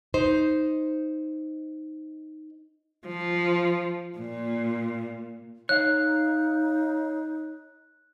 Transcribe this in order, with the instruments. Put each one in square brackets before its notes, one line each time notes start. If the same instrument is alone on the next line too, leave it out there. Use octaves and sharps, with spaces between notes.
[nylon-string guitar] D#4 C5
[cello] F3
A#2
[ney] D#4 [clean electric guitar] C#5 F5 [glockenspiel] F#6